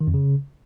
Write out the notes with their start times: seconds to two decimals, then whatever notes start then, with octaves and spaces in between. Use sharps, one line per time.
0.01 D#3
0.07 F2
0.14 C#3